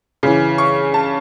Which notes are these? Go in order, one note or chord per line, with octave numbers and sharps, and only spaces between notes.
C#3 E3
C#6
A5